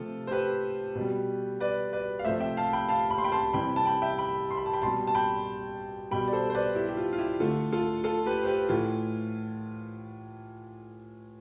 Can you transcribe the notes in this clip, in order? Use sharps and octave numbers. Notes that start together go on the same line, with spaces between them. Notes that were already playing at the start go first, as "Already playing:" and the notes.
Already playing: C3 F3 A3 F4 A4
C5
G4 B4
B2
G3
B4 D5
B4 D5
F5
C3 F3 A3 C5 E5
E5 G5
F5 A5
G5 B5
F5 A5
B5
C6
G5 B5
A5 C6
C3 E3 G3 G5 B5
A5
G5 B5
E5 G5
G5 B5
C6
B5
A5
G5 B5
B2 G3 A5 C6
A5
G5 B5
B2 G3 G5 B5
D5
A4 C5
C5
B4 D5
E4 G4
G4
F4
F4
E4 G4
D3 A3 F4 A4
F4 A4
F4 A4
G4 B4
C5
G4 B4
A2 E3 A3 F4